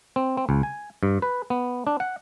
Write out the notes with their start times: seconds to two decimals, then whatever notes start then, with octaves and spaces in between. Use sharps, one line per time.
0.16 C4
0.37 C4
0.49 C#2
0.63 G#5
1.03 G2
1.22 B4
1.50 B3
1.87 D4
2.00 F#5